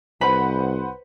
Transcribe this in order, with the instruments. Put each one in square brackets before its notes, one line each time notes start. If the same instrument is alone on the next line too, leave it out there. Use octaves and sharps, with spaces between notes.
[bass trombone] C2 [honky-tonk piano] B4 C5 F#5 [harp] B5